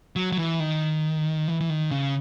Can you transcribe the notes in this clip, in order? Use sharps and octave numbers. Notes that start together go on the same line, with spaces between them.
F#3
F#3
E3
D#3
E3
E3
D#3
C#3